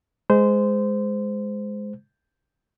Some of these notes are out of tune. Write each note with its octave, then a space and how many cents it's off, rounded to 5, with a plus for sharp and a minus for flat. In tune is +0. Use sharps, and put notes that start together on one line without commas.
G#3 +0 C5 -20